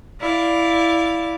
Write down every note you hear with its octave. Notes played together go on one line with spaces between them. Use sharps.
E4 D5 F5